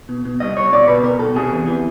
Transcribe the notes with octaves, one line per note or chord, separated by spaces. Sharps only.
B2
B2
C2 D#5
C2 C#5
B2 D5
B2 B4
B2 A#4
B2 A4
C3 G#4
E2
E3